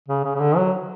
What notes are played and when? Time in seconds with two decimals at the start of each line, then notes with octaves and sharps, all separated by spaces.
0.09 C#3
0.25 C#3
0.35 C#3
0.40 D3
0.56 F#3